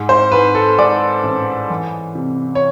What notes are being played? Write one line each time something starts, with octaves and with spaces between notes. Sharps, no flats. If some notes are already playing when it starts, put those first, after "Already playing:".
Already playing: G#2
C5
G#2 B4
A4
G#2 D5
A1
E3
C3
C#5